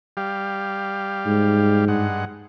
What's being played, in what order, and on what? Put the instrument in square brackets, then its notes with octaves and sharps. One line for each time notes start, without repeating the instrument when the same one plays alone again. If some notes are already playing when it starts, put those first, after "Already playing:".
[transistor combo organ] G3 G4 F5
[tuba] G#2
[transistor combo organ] G2 G#3 F#5